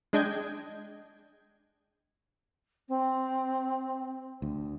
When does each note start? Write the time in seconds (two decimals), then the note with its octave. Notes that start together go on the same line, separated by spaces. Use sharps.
0.13 G#3 D4 D#5 G5 G#6
2.89 C4
4.42 D2